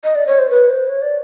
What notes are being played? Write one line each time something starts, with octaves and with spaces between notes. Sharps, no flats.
D#5
D5
C#5
C5
B4
C5
C#5
D5